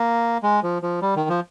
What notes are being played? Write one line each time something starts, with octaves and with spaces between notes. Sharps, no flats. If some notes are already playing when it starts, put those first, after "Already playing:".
Already playing: A#3
G#3
F3
F3
G3
D#3
F3